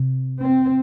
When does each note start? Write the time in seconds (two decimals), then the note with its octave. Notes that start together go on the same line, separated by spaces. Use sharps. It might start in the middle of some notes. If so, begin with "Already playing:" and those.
Already playing: C3
0.41 C4